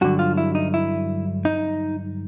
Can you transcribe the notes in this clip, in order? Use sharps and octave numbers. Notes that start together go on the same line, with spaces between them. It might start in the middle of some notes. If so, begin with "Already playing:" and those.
G2 D3 F#3 F#4
F4
E4
D#4
E4
D#4